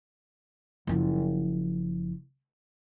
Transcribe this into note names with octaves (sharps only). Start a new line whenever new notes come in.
F#1 F3